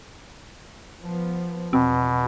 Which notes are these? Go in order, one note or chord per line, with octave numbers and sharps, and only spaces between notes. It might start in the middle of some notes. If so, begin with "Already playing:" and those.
F3 B3
E2 B2 C4